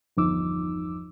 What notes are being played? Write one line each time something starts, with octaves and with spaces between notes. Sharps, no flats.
G1 E2 F3 D#4 D6 E6